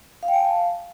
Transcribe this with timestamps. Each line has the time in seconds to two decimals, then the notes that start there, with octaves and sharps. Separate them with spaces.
0.23 F5
0.28 G5
0.34 G#5
0.39 A5
0.45 F5